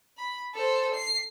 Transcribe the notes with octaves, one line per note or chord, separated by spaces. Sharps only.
B5
A4 C5
C7